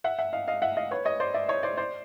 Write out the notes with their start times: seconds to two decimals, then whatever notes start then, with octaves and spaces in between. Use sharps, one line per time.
0.04 E5 F#5
0.19 E5 F#5
0.33 D#5 F5
0.48 D#5 F5
0.62 E5 F#5
0.77 D#5 F5
0.91 B4 C#5
1.05 C#5 D#5
1.20 C5 D5
1.34 D5 E5
1.48 C#5 D#5
1.63 C5 D5
1.77 C5 D5